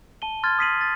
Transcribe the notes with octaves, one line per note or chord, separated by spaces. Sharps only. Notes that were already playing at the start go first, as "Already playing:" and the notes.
A5 D#7 G7
C6 F6 G#6 A6
D#6 F6 B6 C7 D#7 F#7
A6